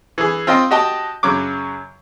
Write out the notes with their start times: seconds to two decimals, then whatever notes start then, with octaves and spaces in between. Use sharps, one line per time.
0.18 E3 G#4
0.47 C4 F4 C5 D#5 G5
0.71 F#4 G4 D#5 G5 A5
1.23 F#2 C#3 F#3 D6